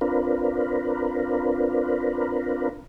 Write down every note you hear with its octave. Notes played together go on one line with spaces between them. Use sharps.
C4 D4 F4 A#4 B4